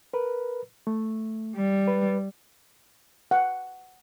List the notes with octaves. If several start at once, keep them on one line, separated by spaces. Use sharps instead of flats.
A#4 B4
A3
G3
B4
F#5